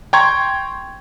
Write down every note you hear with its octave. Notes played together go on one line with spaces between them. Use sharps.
G5 A#5 C6 C#6 G#6